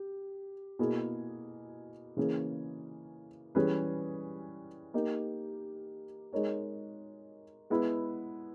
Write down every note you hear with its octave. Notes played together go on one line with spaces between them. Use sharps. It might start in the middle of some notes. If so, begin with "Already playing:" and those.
Already playing: G4
B2 A#3 E4 G#4
C#3 E3 A#3 C#4 G#4
E3 G3 C#4 G#4 B4
A#3 D#4 G4 A#4
G#3 D#4 A#4 C#5
G#3 B3 E4